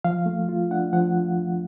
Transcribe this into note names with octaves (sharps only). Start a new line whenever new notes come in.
F3 F5
A3
F4
D4 F#5
F3 F#5